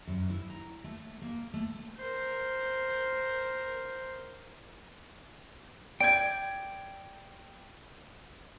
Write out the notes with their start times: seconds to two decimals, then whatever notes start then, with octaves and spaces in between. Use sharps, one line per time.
0.07 F#2
0.30 E4
0.50 A#5
0.84 A3
1.22 A#3
1.54 A3
1.97 A#4 C5
6.00 D5 G5 G6 G#6 D7